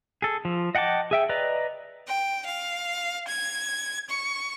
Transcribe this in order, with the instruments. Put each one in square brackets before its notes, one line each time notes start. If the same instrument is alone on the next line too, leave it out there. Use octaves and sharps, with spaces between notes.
[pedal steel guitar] G#4 A4
F3
D#5 F#5 G5 A5 D6
G#4 E5 G5
B4 D5 D#5 A#5
[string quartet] G5
F5
G#6
C#6